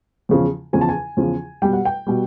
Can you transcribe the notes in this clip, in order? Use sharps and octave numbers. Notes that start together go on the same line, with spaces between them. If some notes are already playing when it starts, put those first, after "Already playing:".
E2 C#3 F3
E2 C#3 F3 G#5
A5
G#5
E2 C#3 F3
B2 G3 G5
F#5
G5
B2 G3